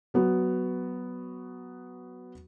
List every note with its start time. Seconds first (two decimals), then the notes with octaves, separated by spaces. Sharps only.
0.14 F#3 B3 F#4